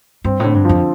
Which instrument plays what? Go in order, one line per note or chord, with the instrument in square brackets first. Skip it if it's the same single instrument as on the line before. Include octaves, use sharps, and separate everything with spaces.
[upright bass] G2 [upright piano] C4
[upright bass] A2 [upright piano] D3
[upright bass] G2
[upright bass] F2 [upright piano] F3